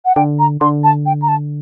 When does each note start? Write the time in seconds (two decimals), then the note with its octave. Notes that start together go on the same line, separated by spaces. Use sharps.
0.05 F#5
0.16 D3 G5
0.39 A#5
0.61 D3 C6
0.84 A5
1.06 G5
1.22 A#5
1.28 A5